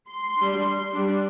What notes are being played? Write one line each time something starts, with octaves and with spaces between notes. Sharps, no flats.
C6
G3 D4
G3 D4